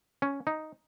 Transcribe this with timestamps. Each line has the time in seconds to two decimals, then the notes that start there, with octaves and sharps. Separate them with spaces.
0.22 C#4
0.47 D#4